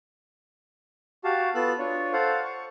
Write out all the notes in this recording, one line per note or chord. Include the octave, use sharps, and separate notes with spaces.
F#4 G4 F5 A5
B3 F4 A4 E6 F#6
D4 F4 C#5
A4 C5 F5 F#5
C#6